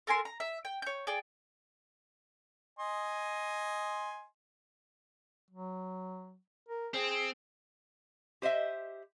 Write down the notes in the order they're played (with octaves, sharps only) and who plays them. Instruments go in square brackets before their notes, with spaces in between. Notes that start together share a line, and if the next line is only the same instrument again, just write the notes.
[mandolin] A4 A#4 G#5 C6
A#5
E5
G5
C#5 G6
G#4 D5 G5
[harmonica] D#5 G#5 C6
[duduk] F#3
A#4
[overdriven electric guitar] C4 [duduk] G#4
[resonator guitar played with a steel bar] G4 C5 D#5 E5